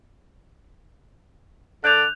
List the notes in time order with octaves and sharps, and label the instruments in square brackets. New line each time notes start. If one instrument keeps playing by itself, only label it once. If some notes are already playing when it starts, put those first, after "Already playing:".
[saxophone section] D3 D5 [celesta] F#6 G6 F7